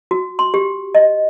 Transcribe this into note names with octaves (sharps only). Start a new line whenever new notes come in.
F#4
C6
G4
D#5